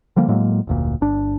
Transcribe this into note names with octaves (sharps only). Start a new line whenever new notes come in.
D3 F3 G3 A#3
A2 F#3 G#3 A#3
F1 D2 A#2
G1 D4